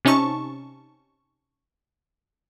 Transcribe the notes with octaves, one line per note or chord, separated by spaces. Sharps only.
C3 C#4 D#4 A5 C#6